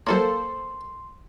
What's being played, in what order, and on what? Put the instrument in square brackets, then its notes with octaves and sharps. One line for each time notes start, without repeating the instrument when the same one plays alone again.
[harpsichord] F#3 E4 C#5 [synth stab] A#3 A4 C5 [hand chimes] C6